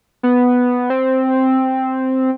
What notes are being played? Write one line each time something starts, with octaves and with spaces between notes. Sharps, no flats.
B3
C4